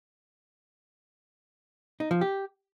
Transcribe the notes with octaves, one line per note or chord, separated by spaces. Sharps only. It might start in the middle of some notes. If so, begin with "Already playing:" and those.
D#4
F3
G4